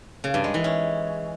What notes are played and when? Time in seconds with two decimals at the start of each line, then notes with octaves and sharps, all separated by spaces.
0.24 C#3
0.34 G2
0.44 G#3
0.54 E3
0.64 C#4